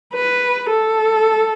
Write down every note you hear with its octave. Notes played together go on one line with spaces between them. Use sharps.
B4
A4